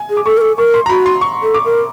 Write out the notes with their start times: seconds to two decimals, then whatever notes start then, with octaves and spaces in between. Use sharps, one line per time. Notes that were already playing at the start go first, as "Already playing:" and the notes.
Already playing: G#5
0.10 G#4
0.17 D6
0.25 A4 C#6
0.37 A#4
0.41 A4
0.58 A#4 C#6
0.74 C6
0.86 A#5
0.89 F#4 B5
1.06 C6
1.21 C#6
1.43 A4
1.54 D6
1.65 A#4